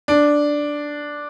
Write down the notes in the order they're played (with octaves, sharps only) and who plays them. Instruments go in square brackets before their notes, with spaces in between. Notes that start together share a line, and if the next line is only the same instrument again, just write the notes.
[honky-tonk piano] D4